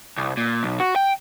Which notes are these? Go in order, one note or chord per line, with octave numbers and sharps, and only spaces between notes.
C2
A#2
B1
F#4
G5